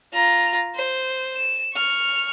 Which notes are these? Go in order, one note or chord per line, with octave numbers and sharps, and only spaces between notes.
F4 A#5
C5
E7
C#6 F6